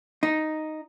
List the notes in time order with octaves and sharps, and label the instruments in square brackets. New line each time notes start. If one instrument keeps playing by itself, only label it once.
[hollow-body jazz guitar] D#4